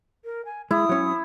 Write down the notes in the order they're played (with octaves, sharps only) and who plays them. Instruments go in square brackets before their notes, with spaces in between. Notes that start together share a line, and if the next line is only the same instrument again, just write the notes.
[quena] A#4
G#5
[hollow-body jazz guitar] G#3 [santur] E4 [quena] D#6
[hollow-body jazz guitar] F#3 C#4